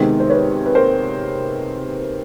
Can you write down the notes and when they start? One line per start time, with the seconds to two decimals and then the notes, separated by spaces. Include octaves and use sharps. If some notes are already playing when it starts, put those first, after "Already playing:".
Already playing: C3 D#3 G#3 B3 A#4 C5
0.20 C5
0.30 B4 C#5
0.66 B4
0.75 A#4 C5